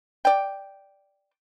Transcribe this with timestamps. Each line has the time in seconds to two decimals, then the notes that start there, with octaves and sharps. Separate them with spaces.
0.25 D5 G5